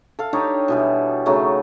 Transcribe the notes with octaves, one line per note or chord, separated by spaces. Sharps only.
A4 F5
D4 D#4 G4 C#5
B2 E3 G3
C#3 F#3 A3 D#4